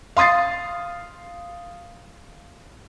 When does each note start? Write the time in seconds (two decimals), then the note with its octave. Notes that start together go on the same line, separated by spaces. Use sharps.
0.17 F5 C6 D#6 A6 C7